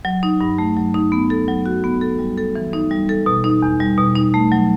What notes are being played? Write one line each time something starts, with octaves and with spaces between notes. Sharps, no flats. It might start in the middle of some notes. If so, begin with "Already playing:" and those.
F#3
D#4
G2
A3
F#3
D#4
B3
A4
F#3
F#4
B3
A4
G3
A4
E3
D#4
G3
A4
B2
D#4
E2
G3
B2
D#4
A3
F#3